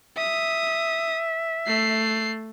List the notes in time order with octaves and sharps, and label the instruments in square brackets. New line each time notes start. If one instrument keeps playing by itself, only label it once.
[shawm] E5 [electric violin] D#6
[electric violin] A3 C7